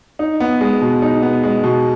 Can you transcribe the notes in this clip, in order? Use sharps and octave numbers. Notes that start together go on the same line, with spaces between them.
D#4
B3
G#3
B2
D#4
B3
G#3
B2